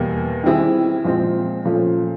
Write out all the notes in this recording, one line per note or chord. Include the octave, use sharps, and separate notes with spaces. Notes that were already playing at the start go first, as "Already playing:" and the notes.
Already playing: E2 B2 G3 A#3
D#3 G3 C4 E4 G#4
A#2 F3 G#3 C4
A#2 F3 A3 C#4